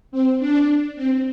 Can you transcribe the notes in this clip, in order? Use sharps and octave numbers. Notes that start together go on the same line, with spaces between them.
C4
D4
C4